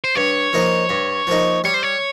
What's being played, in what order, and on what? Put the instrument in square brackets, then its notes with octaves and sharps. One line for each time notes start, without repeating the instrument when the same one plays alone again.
[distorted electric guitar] C5
[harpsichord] G2 [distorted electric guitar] C#5
[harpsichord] F3 A#3 D#4
G2
F3 A#3 D#4
[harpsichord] G3 [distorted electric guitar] C#5
[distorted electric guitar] C5
C#5